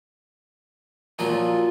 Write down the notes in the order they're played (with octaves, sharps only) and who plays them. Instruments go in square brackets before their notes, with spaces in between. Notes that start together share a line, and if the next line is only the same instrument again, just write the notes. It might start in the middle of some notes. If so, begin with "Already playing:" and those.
[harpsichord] A#2 F3 F#3 [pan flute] F4